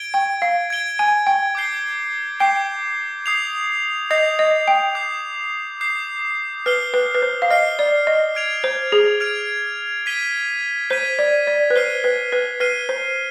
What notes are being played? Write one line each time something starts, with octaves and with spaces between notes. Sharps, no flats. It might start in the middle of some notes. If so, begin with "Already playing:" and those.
Already playing: G#6 D7 G7
G5
F5
G#6 D7 G7
G#5
G5
D6 G6 C7 G7
G5 D6 G6 C7 G7
D#6 G6 C7 F7
D#5 D#6 G6 C7 F7
D#5
G5
D6 G6 C7
D6 G6 C7
B4 F6 C7 G7
B4
B4
C5
F5
D#5 F6 C7 G7
D5
D#5
F6 G#6 D7 F7
C5
G#4
F6 G#6 D7 F7
G#6 B6 D#7 G7
C5 G#6 B6 D#7 G7
D5
D5
B4
C5 F6 C7 D#7 G7
B4
B4
B4 F6 C7 D#7 G7
C5